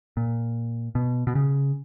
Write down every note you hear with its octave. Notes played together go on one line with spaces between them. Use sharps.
A#2
B2
B2
C#3